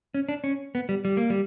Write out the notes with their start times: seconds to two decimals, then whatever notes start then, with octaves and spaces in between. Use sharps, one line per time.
0.14 C#4
0.29 D4
0.44 C#4
0.75 B3
0.89 G3
1.05 G3
1.17 A#3
1.30 G3